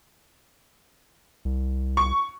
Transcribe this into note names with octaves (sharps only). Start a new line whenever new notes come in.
C2
C#6